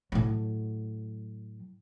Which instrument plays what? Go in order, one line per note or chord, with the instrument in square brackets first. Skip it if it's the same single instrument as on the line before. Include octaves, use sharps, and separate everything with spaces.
[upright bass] A2 F#3